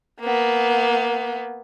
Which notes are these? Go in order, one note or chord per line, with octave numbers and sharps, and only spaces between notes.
A#3 B3